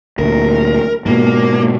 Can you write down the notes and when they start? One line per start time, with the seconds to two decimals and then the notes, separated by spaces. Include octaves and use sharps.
0.19 D2 A#2 A#4
1.06 G#2 B2 A#3